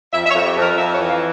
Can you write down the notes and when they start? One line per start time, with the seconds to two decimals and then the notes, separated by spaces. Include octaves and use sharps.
0.13 F2 E5
0.25 E5
0.29 C#5
0.34 F2
0.45 G4
0.57 F2 A#4
0.77 F2 E5
0.94 C#5
0.99 E3
1.10 F5